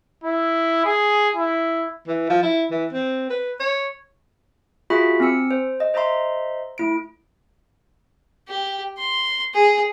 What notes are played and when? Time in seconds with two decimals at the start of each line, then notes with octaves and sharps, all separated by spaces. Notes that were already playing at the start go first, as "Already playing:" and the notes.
0.24 E4
0.85 G#4
1.36 E4
2.07 E3
2.29 F3
2.43 E4
2.71 E3
2.92 C4
3.30 B4
3.60 C#5
4.90 F4 F#4 G#4 E5 B5 B6
5.20 C4 G#5 E6 C#7
5.51 C5
5.80 D#5
5.94 C5 D#5 E5 A#5 C6
6.78 A3 E4 D7
8.48 G4
8.98 C6
9.54 G#4